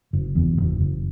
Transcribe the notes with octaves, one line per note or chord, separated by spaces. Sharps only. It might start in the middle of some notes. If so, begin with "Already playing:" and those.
F#1
E2
F#1
F#1